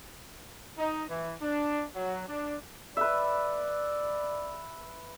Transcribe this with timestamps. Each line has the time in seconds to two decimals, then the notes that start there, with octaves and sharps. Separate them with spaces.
0.78 D#4
1.10 E3
1.42 D4
1.95 F#3
2.28 D4
2.97 B4 D5 E5